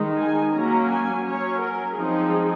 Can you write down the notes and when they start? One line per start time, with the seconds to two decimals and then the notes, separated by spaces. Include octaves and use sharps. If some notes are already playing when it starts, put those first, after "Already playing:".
Already playing: D#3 G#3 D#4
0.18 G#5
0.53 F#3 A#3 C#4 A#5
0.89 G#5
1.25 F#3 C#4 C#5
1.61 A#4
1.97 F3 G#3 C4 D#4 G#4